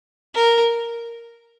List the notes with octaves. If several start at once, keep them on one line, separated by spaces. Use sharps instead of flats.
A#4